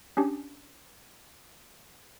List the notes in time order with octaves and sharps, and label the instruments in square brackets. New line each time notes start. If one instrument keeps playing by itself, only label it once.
[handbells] C#4 D4 G4